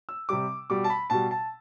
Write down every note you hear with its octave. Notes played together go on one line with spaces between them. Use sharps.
E6
C3 G3 D6
B2 G3 D6
A5
B5
B2 G3 A5
A5